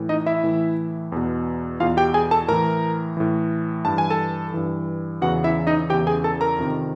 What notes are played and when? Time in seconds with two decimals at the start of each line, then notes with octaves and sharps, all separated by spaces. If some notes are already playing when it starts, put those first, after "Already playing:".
Already playing: A2 E3
0.09 D#4 D#5
0.26 E4 E5
0.43 A2 E3
1.12 E2 B2
1.80 E2 B2 F4 F5
1.97 G4 G5
2.14 G#4 G#5
2.31 A4 A5
2.48 A2 E3 A#4 A#5
3.17 A2 E3
3.85 G2 E3 A5
3.98 G#5
4.10 A4 A5
4.54 G2 E3
5.22 E2 C#3 E3 F#4 F#5
5.44 E4 E5
5.67 D#4 D#5
5.90 E2 C#3 E3 G4 G5
6.07 G#4 G#5
6.24 A4 A5
6.41 A#4 A#5
6.58 F2 C3 D#3